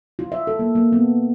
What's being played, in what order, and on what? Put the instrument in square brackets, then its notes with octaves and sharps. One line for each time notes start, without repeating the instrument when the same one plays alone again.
[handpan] F4
E5
A4
A#3
A#3
B3